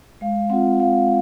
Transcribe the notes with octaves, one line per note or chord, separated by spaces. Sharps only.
G#3 F5
C4 F4 F#5
G#3 F5